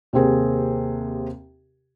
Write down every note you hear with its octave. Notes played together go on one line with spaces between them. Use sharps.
D#2 C3 C4 G#4 A#4